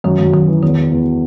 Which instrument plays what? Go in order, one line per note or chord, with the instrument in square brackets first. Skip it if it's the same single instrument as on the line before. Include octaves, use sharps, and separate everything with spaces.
[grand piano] F#2 [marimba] D#3
[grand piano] F#2 [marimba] D#3
[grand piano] F#2 [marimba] D#3
[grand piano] E3
[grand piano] E2 [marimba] D#3
[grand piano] E2
E2